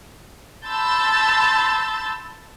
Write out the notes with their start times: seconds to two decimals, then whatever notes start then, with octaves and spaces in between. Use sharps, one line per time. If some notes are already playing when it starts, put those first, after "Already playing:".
0.66 A5 B5 C6 E6 G6 A6